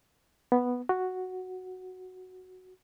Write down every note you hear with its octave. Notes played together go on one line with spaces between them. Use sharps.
B3
F#4